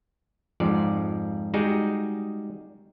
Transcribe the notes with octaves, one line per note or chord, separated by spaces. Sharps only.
F2 G#2 F3 D5
G3 G#3 D#4 F#4 G#4